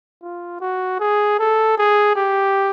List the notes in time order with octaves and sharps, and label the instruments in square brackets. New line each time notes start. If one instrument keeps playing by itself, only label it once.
[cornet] F4
F#4
G#4
A4
G#4
G4